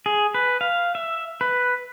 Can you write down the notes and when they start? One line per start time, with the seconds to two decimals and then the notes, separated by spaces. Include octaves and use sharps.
0.06 G#4
0.34 B4
0.61 F5
0.95 E5
1.41 B4